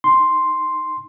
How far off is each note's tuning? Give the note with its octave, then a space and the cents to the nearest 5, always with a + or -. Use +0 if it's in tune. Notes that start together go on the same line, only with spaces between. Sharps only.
D#4 +0 C6 +0